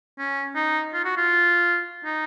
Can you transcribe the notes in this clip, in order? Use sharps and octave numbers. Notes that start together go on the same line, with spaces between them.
C#4
D#4
F4
F#4
F4
D#4